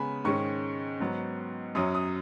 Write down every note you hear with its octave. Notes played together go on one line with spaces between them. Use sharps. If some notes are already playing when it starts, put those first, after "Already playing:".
Already playing: C#3 G#3 B3 G#5 B5
G#2 D#3 G#3 C#4 C#6
G#2 F#3 B3
F#2 F#3 C#4 D#6
D#6